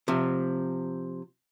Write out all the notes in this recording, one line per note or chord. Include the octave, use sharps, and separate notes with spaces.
C3 F3